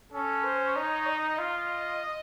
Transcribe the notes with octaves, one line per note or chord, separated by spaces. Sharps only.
C#4 A4
C5
D#4 C#5
D#5
F4 D#5